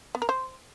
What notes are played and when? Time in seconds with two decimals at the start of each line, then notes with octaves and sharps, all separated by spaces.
0.15 B3
0.22 A#4
0.29 C5